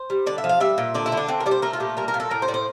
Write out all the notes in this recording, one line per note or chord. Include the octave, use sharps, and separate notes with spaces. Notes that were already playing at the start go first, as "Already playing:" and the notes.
Already playing: C5
G3
D3 D5
E5
F3
F5
G3 E5
A#2
D3 D5
E4
D3
D4
D3 C4
A#4
G3 D5
C5
A3 A#4
F4
A#2 G4
G3 A#4
A#4
A#2
A4
A2 A#4
C5
A2 D5
C5